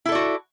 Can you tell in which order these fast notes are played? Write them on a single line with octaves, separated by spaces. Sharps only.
E4 A4 D5 F#4